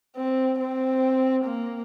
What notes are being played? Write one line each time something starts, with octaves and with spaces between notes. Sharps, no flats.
C4
C4
A#3